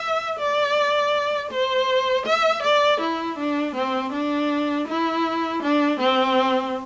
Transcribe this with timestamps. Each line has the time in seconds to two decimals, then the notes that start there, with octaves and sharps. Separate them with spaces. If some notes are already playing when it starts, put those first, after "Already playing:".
Already playing: E5
0.39 D5
1.51 C5
2.26 E5
2.63 D5
3.01 E4
3.38 D4
3.76 C4
4.13 D4
4.88 E4
5.63 D4
6.00 C4